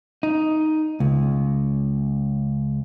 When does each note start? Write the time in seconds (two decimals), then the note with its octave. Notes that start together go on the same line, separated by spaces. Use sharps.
0.23 D#4
1.00 C#2